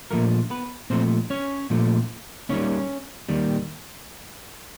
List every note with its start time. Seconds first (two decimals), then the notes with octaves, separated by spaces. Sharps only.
0.11 A#2 F3 A3 A#3 A#4
0.50 B3 B4
0.90 A#2 F3 A3 C4 C5
1.30 C#4 C#5
1.70 A#2 F3 A3
2.49 D#2 D#3 G3 C#4 C#5
3.29 D#2 D#3 G3